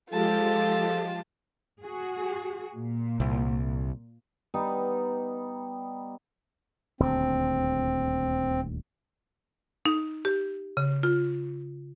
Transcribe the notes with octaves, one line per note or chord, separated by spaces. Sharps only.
F3 G#3 F4 G4 A4 A5
F#4 G#4
A#2
C2
G3 B3 D#4
D#1 D2 C4
D#4
G4
C#3
F4